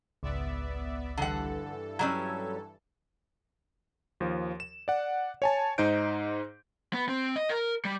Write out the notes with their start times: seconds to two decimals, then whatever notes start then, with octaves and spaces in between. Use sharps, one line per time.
0.23 G#1 C#2 B3 D5 E5
1.17 G2 D3 E3 A4 F#5
1.99 F#3 G3 C#4 E6 G#6
4.20 D#2 F3
4.60 E7
4.88 D5 F#5
5.42 C#5 G#5 A5
5.78 G#2 D#4 C5 G6 D7
6.94 B3
7.09 C4
7.36 D#5
7.50 A#4
7.85 G3